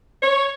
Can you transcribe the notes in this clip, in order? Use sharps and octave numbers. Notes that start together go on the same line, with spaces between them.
C#5